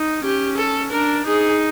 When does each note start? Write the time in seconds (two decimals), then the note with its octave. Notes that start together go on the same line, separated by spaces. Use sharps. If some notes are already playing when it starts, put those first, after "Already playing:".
Already playing: D#4
0.24 C#4 G4
0.58 A4
0.92 D4 A#4
1.26 D#4 G#4